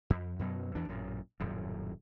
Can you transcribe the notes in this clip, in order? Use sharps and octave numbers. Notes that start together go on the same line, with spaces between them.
F2
F#2 B2 F#3
E2 E3 D4
A1 F#2 A#2
D#1 F#2 A2